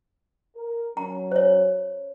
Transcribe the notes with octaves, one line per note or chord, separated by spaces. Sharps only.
A#4
F#3 C#4 A#5
C5 C#5